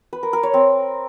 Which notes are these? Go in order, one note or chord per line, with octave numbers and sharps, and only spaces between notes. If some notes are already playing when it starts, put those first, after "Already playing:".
B4
A#4
A#4
C#5
C4